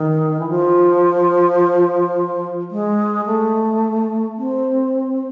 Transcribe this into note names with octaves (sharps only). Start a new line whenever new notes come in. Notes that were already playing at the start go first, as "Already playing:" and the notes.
Already playing: D#3
E3
F3
G#3
A3
C4